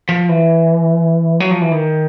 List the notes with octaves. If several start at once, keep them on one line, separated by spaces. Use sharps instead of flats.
F3
E3
F#3
F3
E3
D#3